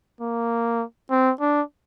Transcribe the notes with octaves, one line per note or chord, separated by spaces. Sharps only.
A#3
C4
D4